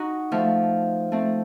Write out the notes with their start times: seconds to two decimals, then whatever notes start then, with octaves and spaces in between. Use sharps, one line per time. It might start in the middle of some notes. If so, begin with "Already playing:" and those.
Already playing: D#4 F#4
0.32 F3 A3
1.12 A3 C4